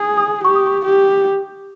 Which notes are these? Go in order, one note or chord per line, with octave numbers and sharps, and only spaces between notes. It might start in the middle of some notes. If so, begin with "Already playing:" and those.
Already playing: G#4 D#6
D#6
G4 C#6
D#6
C#6
G4